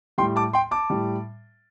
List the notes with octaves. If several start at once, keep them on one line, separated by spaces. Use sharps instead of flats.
A2 G3 G5 C6
A5 D6
G5 C6
A5 D6
A2 G3